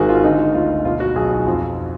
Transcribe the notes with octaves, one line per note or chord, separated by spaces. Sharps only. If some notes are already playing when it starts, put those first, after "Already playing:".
Already playing: G#1 D#3 F#4 G#4
F4
D3 D#4
D2 F4
B2 F4
F#4
B1 G#4
F#4
F2 F4